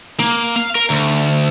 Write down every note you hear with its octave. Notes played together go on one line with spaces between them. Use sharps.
A#3
F5
A#4
D2